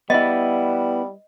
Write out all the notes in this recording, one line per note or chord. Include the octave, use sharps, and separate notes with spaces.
G3 B3 E4 D#5